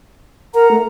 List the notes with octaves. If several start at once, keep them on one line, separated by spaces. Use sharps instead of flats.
A#4 F#5 A#5
A3